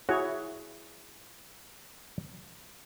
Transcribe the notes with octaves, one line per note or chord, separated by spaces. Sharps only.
E4 F#4 G#4 C#5